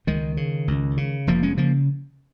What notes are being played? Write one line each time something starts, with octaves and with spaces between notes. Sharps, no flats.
C#2 D#3 G#3
C#3
C#2
C#3
F1 F3 A#3
G#3 C#4
C#3 F3 A#3